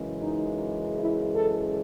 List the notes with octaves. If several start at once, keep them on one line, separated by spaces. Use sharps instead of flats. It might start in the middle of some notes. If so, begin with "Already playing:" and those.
Already playing: F#2 C#3 E3 G#3
D#4
E4
A4